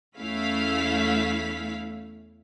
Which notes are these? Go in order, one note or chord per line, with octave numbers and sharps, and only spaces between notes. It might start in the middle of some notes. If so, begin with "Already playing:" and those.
E2 A3 C#4 E4 F5 B6